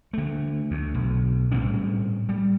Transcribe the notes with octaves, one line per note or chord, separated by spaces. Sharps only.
D3 A3
D2
B1
A2 G3 C4 C#4
G3